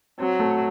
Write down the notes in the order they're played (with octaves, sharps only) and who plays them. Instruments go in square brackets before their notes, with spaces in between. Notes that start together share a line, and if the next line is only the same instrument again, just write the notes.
[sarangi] F#3 [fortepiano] C4
[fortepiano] A3